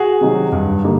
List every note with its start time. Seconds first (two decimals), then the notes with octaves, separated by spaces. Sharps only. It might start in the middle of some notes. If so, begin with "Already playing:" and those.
Already playing: F#4 G#4
0.21 C3 D#3 F#3
0.52 G2
0.84 D3 G3 A#3 D#4